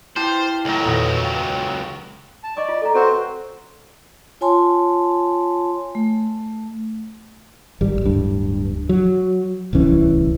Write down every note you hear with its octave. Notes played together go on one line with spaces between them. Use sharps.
E4 G4 C5 F5 A5
C#2 A2 F#3 A#4
E2 A#2 D#3 B3
F5 G5
A5
D5 D#5 C#6 D6
F4
A4 D5 A#5
C4 F#4 A4 B4 C5
F4 C#5 G#5 A5 C6
A3
G#1 G3
D1 G2
F#3
D1 C2 E3 C#4